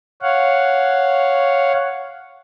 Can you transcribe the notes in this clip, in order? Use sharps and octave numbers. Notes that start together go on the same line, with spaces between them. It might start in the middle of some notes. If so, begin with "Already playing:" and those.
C#5 F5 F#5